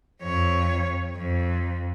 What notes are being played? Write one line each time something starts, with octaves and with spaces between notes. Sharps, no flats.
F2 C#5
F2